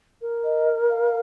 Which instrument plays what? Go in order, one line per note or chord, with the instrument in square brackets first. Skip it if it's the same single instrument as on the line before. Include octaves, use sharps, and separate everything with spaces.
[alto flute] A#4
[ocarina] D#5
F5